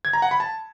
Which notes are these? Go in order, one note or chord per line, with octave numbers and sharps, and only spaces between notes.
G#6
A#5
F#5
B5
A5